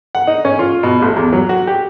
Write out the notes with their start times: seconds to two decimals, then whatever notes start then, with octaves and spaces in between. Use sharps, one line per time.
0.15 F#5
0.27 D#4
0.45 C#4
0.59 F4
0.83 B2
1.02 A1
1.16 E2
1.33 F#3
1.49 F#4
1.67 G4